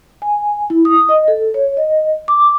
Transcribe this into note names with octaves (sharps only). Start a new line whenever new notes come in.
G#5
E4
D#6
D#5
A4
C#5
D#5
D6